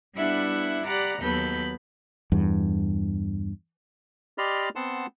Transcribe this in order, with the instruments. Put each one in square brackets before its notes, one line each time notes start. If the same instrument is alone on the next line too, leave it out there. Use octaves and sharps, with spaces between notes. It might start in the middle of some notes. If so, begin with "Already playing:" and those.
[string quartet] G3 B3 D4 E4 E5 F#5
G4 D5 F#5 A#5 B5
D#2 F#3 B3 A4 B5 G6
[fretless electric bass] E2 G2
[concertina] G4 D5 D#5 B5 C6 F6
B3 C4 F#5 A5 C6